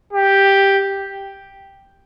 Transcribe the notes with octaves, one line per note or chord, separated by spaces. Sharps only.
G4